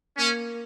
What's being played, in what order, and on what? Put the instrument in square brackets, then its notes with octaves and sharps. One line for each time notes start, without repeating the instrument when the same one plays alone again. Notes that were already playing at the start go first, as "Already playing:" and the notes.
[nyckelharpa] A#3 [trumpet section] C#4